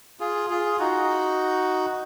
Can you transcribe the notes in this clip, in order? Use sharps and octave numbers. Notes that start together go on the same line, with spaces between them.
F4 G#4
F4 G#4
D#4 F#4